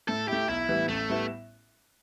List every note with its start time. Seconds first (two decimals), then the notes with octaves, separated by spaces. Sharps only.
0.08 A2 A4
0.28 A3 E4 G4
0.48 B1 E4
0.69 A2 E3 G3 B3
0.89 A1 A3
1.10 A2 G3 B3 E4